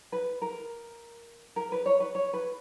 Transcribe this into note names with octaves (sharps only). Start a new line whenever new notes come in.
B4
A#4
A#4
B4
C#5
B4
C#5
B4